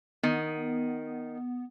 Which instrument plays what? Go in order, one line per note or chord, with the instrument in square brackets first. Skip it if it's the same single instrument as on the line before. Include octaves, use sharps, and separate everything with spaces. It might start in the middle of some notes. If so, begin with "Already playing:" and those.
[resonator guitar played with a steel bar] D#3 [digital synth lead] B3